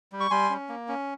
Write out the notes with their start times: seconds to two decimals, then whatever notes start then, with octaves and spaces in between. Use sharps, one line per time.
0.12 G3
0.20 C#6
0.31 G3 G#5 C6
0.50 C#4
0.69 A#3
0.88 C#4